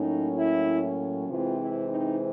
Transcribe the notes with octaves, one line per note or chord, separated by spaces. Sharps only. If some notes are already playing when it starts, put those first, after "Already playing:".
Already playing: A2 F#3 A#3 C#4 D#4
E4
C3 E3 G#3 C4 F4
E4
D#4